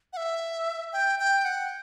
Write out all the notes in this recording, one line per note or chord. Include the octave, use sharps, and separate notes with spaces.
F#5
E5
G5
G5
F#5